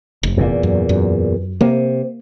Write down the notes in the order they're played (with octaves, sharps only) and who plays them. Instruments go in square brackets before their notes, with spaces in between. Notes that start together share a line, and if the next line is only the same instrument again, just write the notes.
[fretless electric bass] F1
[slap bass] E2 A#2
[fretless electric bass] F#2
F#2
[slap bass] C3 [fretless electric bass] A#3